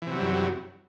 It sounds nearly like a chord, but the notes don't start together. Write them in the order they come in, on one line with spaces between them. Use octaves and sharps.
E3 C3 F#3 G3 F#2